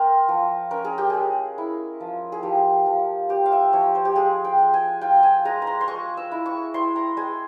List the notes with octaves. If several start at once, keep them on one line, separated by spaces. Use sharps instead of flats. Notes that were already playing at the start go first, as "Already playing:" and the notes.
Already playing: C4 A#4
F3
C#4 A#4
G#4
G4
G#3 G#4
E4
F3
G#4
F3 G4
F3
C4 G4
F5
E5
F3 C#5
C5
G4
G#3 G#4
G5
G#3
G#5
F4 G5
G#5
G#3 A#5
A#5
C6
C6
G#3 C#6
E6
E4
C#6
E4 C6
A#5
G#3 G#5